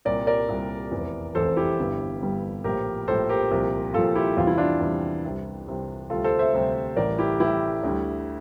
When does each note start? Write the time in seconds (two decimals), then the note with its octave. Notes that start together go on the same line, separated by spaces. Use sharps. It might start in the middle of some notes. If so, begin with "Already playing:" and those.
0.05 C2 A#2 G3 A#4 D5
0.27 A#4 D5
0.49 C2 A#2 G3
0.91 F1 E2 E3
1.35 F1 E2 E3 A4 C5
1.57 E4 G4
1.78 G1 G2 D3 G3
2.21 G1 G2 D3 G3
2.64 A#1 A2 F3 G4 A#4
3.08 A#1 A2 F3 A4 C5
3.29 G4 A#4
3.51 C2 A#2 F3
3.94 C2 A#2 F3 F4 A4
4.15 E4 G4
4.37 E2 C3 G3 F4
4.47 E4
4.58 D4 F4
4.81 E2 C3 G3
5.24 C2 C3 G3
5.67 C2 C3 G3
6.10 D2 C3 G3 F4 A4
6.24 A4 C5
6.39 C5 E5
6.53 D2 C3 G3
6.96 A1 A2 E3 G3 A#4 D5
7.19 E4 G4
7.40 A1 A2 E3 G3 E4 G4
7.83 D2 D3 G3